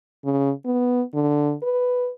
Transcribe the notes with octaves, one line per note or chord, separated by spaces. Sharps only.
C#3
B3
D3
B4